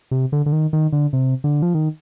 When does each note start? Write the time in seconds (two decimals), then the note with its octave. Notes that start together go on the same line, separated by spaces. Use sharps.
0.11 C3
0.32 D3
0.46 D3
0.52 D#3
0.73 D#3
0.93 D3
1.13 C3
1.44 D3
1.62 F3
1.74 D#3